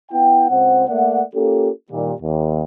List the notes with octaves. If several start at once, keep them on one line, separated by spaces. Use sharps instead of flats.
B3 E4 F#5 G5
C#2 C4 C5 F#5
A3 A#3 D5 E5 F#5
A#3 C#4 F4 G4 A4
A#2 D#3 G3
D#2